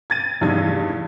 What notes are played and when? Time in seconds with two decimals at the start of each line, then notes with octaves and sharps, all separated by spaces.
0.10 G#6 A6 D#7
0.41 F1 E2 G2 D#4 E6 G#6